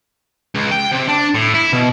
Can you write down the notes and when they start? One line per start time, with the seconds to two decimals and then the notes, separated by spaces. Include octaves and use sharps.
0.55 C#2
0.71 G5
0.91 C3
1.08 D4
1.34 A2
1.54 E4
1.73 B2